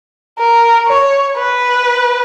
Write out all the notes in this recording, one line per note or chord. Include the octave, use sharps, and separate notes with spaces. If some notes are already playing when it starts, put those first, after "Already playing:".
A#4
C#5
B4